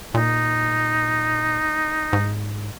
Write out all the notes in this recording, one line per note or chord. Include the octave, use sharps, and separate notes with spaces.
A#2 D#4
G#2